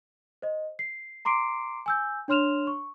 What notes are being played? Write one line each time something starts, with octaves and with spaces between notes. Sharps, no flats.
C5 D#5
C7
A#5 C6 D6 C7 D7
G#5 E6 G6
D4 C#5 C6 F6 E7 F7
C#6